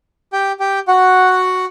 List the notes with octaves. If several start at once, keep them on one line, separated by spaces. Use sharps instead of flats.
G4 G5
G4 G5
F#4 F#5